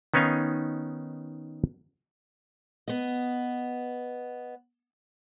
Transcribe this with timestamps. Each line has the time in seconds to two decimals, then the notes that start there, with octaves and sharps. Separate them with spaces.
0.14 D#3 B3 C#4 D#4 F5 G#5
2.88 B3 D#5